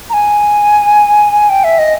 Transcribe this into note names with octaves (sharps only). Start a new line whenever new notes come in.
A#5
G#5
G5
E5
D#5